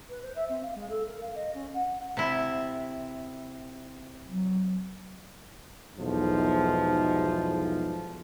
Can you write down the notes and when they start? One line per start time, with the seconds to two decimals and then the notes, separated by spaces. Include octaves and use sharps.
0.09 B4
0.22 C5
0.36 E5
0.50 C4
0.62 F5
0.75 G#3
0.90 A4
1.07 A#4
1.21 F5
1.35 D#5
1.55 C#4
1.74 F#5
2.17 C3 E4
4.27 F#3
5.97 B1 E2 G#2 F3